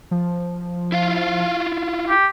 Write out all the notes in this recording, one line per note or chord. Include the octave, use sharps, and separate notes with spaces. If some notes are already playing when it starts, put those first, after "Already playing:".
F3
E4 F4 F5
G4